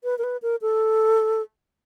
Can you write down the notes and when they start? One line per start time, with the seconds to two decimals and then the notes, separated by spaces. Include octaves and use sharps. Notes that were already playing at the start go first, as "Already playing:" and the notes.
0.04 B4
0.18 A#4
0.24 B4
0.42 A#4
0.62 A4